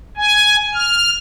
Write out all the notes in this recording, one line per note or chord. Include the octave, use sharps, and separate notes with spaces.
G#5
F6